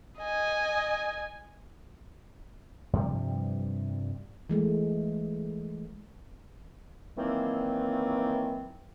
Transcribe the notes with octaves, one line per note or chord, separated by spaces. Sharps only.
D#5 G#5
G2 C3 F3 G3
E3 G#3 A3
D#3 E3 F#3 A#3 C4